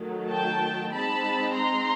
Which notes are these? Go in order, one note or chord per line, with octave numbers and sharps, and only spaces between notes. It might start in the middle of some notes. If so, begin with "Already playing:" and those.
Already playing: D#3 F#3 A3
G5 A5
G#3 C4 D#4 A5 B5
A#5 C6